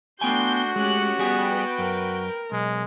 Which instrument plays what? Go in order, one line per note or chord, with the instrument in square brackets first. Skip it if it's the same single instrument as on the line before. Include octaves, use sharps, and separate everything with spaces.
[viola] A3 D4 [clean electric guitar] B3 G5 G#5 [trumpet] F#4 [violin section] C6 G6
[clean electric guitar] G#3 [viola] A3 G4 [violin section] C#4 F#6
[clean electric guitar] G3 G4 G#4 [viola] B3 [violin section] B4 G5
[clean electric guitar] F#2 [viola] A#4
[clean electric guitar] B1 [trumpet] G#3